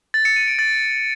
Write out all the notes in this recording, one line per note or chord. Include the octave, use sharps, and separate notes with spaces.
A6
C#7
D#7
D7
A6